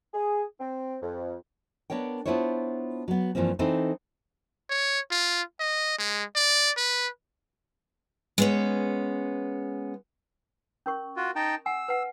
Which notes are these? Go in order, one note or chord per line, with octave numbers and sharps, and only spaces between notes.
G#4
C4
F2
B3 D4 A#4 C#5 G5
B3 D4 E4 F4 C5 C#5
F#3 B3
G2 E3 F3 A#3 C4
E3 C4 D#4 E4 A4 C5
C#5
F4
D#5
G#3
D5
B4
G#3 B3 C#4
C#4 A#4 C#6
F4 F#4
D#4 G5 A5
F#5 G#5 E6
B4 F#5